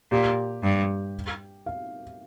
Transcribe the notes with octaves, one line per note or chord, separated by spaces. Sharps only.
A#2 G4
G2
F5